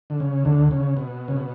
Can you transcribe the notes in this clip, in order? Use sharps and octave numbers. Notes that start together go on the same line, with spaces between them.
D3
C#3
D2 D3
C#3
B2
C#3
B2